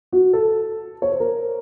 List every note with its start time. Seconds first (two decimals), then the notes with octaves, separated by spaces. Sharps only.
0.12 F#4
0.33 A4
1.02 C#5
1.11 C5
1.20 A#4